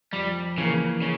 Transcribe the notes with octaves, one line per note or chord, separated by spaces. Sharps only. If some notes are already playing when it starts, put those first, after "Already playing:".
F2 G3
C#3 E3 A#3
C#3